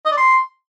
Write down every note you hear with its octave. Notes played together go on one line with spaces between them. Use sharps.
D#5
D5
C6